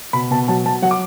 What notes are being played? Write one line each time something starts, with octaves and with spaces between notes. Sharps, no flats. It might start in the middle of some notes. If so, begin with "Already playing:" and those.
B2 B5
B2 A5
F#3 A5
F#3 A5
F#3 F#5
D6